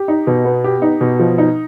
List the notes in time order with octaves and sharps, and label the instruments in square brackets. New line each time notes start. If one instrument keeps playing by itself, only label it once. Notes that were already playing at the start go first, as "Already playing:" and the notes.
Already playing: [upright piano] G4
D#4
B2
B3
G4
D#4
B2
F3
D#4